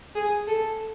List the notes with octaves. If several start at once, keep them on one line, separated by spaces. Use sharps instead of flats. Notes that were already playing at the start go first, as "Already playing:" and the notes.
G#4
A4